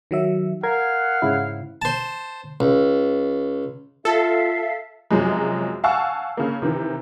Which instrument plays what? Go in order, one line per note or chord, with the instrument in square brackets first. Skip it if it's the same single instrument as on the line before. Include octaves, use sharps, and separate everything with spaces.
[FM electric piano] D#3 F#3 E5
[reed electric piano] A#4 [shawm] F5 [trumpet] F#5 [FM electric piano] G#6
[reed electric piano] G#2 C#3 E4
[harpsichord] C5 A5
C#2
[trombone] F4 [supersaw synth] A4 [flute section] E5 F5
[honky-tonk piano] F#2 C3 F3 F#3 G#3
F5 F#5 G#5 A5 C#6 E6
C#3 A#3
C3 D#3 E3